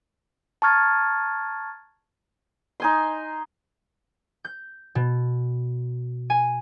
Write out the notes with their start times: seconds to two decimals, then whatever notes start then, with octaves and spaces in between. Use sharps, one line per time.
0.62 A5 A#5 C#6 F6 G#6 A6
2.80 D#4 G#5 C6
4.45 G6
4.95 B2
6.30 G#5